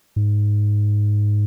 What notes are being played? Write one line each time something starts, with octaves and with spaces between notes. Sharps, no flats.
G#2